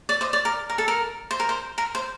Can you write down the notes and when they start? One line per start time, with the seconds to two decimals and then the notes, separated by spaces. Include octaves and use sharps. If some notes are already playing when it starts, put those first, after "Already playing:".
0.09 D5
0.21 C5 D#5
0.33 D5
0.45 A#4
0.70 A#4
0.78 A4
0.88 A#4
1.31 C5
1.40 A#4
1.49 C5
1.78 A#4
1.95 C5